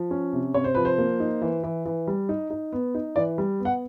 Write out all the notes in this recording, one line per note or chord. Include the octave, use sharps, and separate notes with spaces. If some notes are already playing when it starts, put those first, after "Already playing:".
Already playing: F3
C#4
C3
C3 C#5
C5
F3 B4
C5
A#3
D#4
E3
E3
E3
G3
D#4
D#4
B3
D#4
E3 D5
G3
B3
F#5